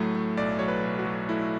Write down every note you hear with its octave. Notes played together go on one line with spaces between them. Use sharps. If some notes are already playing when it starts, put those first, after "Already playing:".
Already playing: A2 F#3 A3
A3
B1 D5
F#3 C#5
B4
B1
F#4
F#3
A3 E4